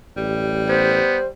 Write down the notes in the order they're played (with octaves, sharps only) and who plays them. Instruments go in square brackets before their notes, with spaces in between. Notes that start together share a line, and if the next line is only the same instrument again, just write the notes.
[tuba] A1 [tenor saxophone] G3
[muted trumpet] B3 [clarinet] C5